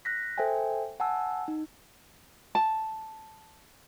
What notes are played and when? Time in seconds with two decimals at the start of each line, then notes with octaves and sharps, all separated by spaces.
0.05 F#6 A#6 B6
0.38 A4 C5 E5 G5 G#5
1.00 F#5 G#5 A5 E6
1.48 D#4
2.55 A5